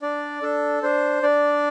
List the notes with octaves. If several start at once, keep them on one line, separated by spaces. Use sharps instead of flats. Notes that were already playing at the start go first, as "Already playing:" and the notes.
D4 D5
D4 A4
D4 C5
D4 D5